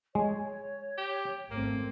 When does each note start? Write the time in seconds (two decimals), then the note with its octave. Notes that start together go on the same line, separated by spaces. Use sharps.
0.15 G#3 C#5
0.97 G4
1.51 G#1 A3 A#3 C4